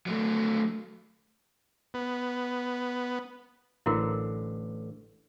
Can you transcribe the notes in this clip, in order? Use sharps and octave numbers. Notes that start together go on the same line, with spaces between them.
F#3 A3
B3
A1 D3 E4 F#4 A#4